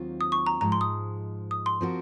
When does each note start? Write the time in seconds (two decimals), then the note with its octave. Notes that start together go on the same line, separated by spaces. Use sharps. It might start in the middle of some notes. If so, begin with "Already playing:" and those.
Already playing: D#2 D#3 F#3 C4 F4
0.21 D#6
0.32 C#6
0.46 A#5
0.61 G#2 F3 G#3 A#5
0.72 C6
0.81 D#6
1.51 D#6
1.66 C6
1.81 F3 C4 F#4 A#4